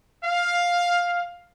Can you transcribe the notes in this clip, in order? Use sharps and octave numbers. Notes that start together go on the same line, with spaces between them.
F5